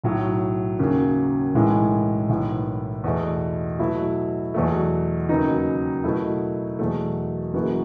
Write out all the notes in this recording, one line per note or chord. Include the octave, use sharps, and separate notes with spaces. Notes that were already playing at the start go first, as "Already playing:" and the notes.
B1 A2 F#3
D#2 C#3 F#3
B1 A2 E3 G#3
B1 A2 E3 B3
E2 B2 A3
B2 F#3 A3 E4
E2 B2 F#3 A3
D#2 C#3 F#3 B3 D#4
B2 F#3 A3 E4
E2 B2 F#3 A3
F#1 F#2 E3 B3 F#4